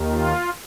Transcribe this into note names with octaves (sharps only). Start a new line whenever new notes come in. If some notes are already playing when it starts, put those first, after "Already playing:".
Already playing: D#2 D#3
F4